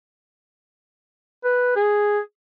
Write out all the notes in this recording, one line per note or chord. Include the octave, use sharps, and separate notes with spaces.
B4
G#4